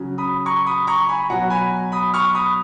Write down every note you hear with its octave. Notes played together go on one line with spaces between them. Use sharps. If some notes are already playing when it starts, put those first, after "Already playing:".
Already playing: C#3 F#3
B5 D#6
A#5 C#6
B5 D#6
A#5 C#6
G#5 B5
B2 F#3 F#5 A#5
G#5 B5
B5 D#6
C#6 F6
B5 D#6